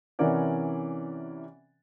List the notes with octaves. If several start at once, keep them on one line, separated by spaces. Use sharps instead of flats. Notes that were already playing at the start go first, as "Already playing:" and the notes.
C3 E3 C#4 A#4 D5 F#5